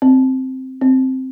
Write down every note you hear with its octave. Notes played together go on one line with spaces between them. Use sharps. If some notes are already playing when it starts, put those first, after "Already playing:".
C4
C4